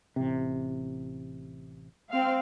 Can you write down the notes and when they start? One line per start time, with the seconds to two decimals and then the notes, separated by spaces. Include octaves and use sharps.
0.16 A1 C3
2.11 C4 F5